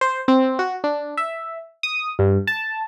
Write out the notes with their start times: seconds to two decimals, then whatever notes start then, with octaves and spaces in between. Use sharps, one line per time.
0.01 C5
0.28 C4
0.59 F#4
0.84 D4
1.17 E5
1.83 D#6
2.19 G2
2.47 A5